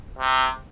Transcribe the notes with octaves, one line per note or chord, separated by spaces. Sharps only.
C3